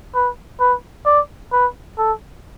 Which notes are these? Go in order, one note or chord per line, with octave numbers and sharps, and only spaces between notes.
B4
B4
D5
B4
A4